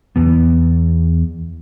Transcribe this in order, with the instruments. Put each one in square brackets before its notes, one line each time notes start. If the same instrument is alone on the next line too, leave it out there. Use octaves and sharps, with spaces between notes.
[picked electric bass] E2 E3 B3